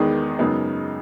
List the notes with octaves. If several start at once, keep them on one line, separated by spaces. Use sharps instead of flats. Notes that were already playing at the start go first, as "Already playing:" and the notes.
Already playing: E2 D#3 G#3 B3 D#4
F#2 C#3 G#3 B3 D#4